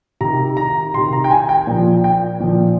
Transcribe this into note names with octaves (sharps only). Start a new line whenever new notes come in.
C3 D#3 A#5
A#5
C3 D#3 C6
A#5
G5
G#5
G5
A#2 F3
G5
A#2 F3